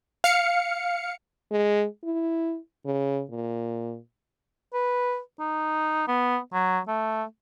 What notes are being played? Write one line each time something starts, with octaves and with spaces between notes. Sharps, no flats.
F5 C#7
G#3
E4
C#3
A#2
B4
D#4
B3
F#3
A3